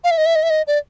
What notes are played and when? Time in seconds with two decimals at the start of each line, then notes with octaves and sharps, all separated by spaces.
0.04 F5
0.11 E5
0.18 D#5
0.26 E5
0.36 D#5
0.43 E5
0.50 D#5
0.67 D5